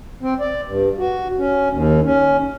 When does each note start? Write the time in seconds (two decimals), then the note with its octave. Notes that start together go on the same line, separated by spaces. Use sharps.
0.23 C4
0.40 D5
0.67 G2
0.99 F#4
1.38 C#4
1.71 D#2
2.04 C#4